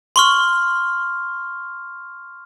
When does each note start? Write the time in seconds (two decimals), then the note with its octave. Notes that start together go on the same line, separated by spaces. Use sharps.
0.16 C6 C#6 F6